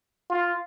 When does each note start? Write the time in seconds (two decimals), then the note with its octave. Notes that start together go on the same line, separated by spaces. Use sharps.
0.30 F4